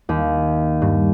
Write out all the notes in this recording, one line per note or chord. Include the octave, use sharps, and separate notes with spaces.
D#2
G2